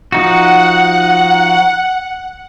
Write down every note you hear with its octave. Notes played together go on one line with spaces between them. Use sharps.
F3 D#4 F#4 F#5